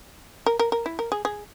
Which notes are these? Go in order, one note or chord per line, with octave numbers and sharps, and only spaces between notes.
A#4
A#4
A#4
E4
A#4
G#4
G#4